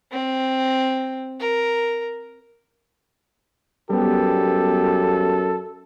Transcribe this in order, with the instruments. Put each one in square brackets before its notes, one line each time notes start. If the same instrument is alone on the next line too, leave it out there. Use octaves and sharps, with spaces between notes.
[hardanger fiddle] C4
A#4
[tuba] F#2 [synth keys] G3 B3 [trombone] G4 [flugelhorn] A4